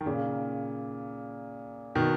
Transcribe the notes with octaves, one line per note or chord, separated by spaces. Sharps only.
D#3
A#2 C#3
B2 D#3